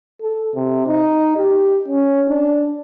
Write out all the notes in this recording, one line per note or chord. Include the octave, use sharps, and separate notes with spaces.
A4
C3
D#4
G4
C#4
D4